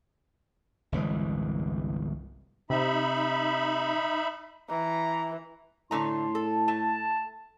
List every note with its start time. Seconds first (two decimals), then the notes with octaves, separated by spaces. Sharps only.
0.92 G1 C2 E3 G#3
2.70 C3 D#4 E5 B5
4.70 E3 A#5
5.91 A2 D3 A3 A#5 C6
6.35 A4
6.68 A3 A5